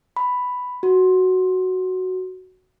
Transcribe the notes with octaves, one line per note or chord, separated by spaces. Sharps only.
B5
F#4